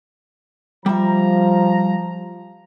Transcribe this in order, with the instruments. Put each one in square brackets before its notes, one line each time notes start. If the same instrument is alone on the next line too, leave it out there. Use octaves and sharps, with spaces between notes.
[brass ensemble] F3 A#5 [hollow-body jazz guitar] G3 E5